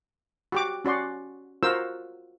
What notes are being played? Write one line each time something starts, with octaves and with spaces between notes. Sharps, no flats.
F#4 G4 D6
C#4 F#4 D5 C6
F4 F#4 A#4 C5 E6